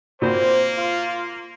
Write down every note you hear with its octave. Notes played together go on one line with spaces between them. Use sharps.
A#2 A#3 C4 F#4 C5 B5
F4